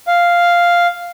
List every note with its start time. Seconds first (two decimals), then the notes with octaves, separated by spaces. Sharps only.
0.07 F5